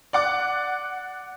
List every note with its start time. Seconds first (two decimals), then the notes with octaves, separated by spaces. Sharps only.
0.13 D5 F#5 D6